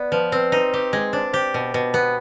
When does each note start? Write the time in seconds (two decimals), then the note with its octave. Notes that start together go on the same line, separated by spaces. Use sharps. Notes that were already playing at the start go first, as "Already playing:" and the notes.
Already playing: B3 D5
0.12 F3 B4
0.32 C4 B4
0.52 D#4 B4
0.72 G4 B4
0.93 G#3
1.13 D4 C5
1.33 G4 C5
1.54 B2
1.74 B2
1.94 B3